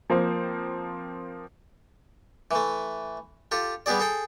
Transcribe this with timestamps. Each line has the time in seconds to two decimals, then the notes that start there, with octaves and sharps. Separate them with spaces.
0.10 F3 A#3 C4 C5
2.51 E3 A3
3.51 F4 G4 A4
3.86 G3 B3 G4 G#4 D5
3.99 G#4 A4 G5